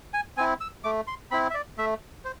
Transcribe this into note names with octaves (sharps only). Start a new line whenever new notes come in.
G#5
C4 E4 G#5
E6
A3 D6
C6
C4 E4 B5
E5
D5
A3 E5
C5